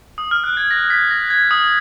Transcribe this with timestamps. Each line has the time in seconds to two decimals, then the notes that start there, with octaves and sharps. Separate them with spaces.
0.18 D#6
0.31 F6
0.44 F#6
0.57 G#6
0.71 A#6
0.90 B6
1.11 A#6
1.30 G#6
1.51 D#6